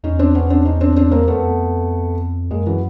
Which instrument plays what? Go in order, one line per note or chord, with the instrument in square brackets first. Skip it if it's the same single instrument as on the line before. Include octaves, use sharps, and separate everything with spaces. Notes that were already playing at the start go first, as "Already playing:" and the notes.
[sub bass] E2 [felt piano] C#4 D#4
[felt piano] C4 D4
B3 C#4
C4 D4
C#4 D#4
C4 D4
C4 D4
A#3 C4
[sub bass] F2 [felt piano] A3 B3
[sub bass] F#2 [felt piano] G#3 A#3
[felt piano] E3 F#3